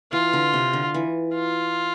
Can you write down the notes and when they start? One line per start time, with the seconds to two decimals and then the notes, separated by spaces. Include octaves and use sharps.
0.12 E3 F4
0.33 D3
0.53 C3
0.73 D3
0.94 E3
1.34 F4